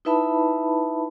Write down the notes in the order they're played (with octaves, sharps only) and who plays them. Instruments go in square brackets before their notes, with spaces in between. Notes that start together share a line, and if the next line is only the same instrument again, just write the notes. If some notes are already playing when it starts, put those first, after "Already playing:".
[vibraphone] D#4 E4 B4 E5 A5 B5